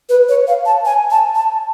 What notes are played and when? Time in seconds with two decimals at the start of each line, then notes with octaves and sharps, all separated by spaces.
0.09 B4
0.29 C#5
0.47 F5
0.66 A5
0.85 G#5
1.10 A5
1.35 A5